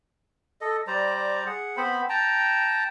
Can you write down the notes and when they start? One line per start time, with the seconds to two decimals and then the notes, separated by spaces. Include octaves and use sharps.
0.61 A4 D#5
0.87 G3 C5 D5 A#5
1.46 G#4 F#5
1.77 B3 C4 C5 B5
2.09 G5 A5 A#5